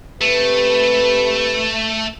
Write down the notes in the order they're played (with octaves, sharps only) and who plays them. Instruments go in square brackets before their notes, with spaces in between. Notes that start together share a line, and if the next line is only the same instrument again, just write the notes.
[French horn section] C3 G4 B4 [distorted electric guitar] A3